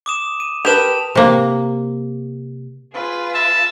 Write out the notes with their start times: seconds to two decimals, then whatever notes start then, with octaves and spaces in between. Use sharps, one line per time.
0.06 D6 D#6 E7
0.40 D#7
0.65 G4 A#4 B4 A5 E7 F7
1.15 C3 A#3
2.93 F4 G#4 B4
3.34 E5 A5